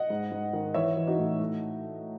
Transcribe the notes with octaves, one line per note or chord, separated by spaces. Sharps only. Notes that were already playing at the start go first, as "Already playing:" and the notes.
Already playing: D#5 F#5
G#2
G#2
D#3
E3 C#5 E5
E3
D#4 F#4
A2
A2